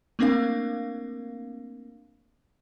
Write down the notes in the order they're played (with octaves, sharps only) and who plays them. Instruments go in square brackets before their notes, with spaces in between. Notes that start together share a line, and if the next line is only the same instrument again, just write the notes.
[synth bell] A3 A#3 C4 D4 A#4 F5